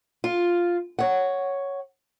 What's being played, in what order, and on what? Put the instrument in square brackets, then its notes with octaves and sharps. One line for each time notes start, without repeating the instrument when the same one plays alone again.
[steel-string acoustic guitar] F4
C#5 F#5